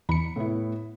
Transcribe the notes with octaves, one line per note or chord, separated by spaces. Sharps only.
E2 B5 C#7
A2 B3 E4